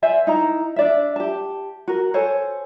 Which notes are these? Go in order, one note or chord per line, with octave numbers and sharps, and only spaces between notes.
C5 D5 E5 G#5
D#4 E4 A#5
D4 D5 E5
G4 A5
F#4 A#4
A4 C5 C#5 G#5